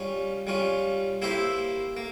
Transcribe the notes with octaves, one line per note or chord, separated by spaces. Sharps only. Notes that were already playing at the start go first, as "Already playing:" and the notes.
Already playing: G3 C#4 F4
G3 C#4 F4
A#3 E4 G4 C5 E5
A#3